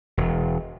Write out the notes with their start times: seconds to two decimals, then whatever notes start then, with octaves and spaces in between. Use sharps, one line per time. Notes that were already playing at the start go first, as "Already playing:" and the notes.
0.17 E1